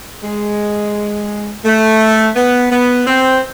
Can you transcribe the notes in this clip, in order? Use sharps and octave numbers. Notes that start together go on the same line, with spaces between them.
G#3
A3
B3
B3
C4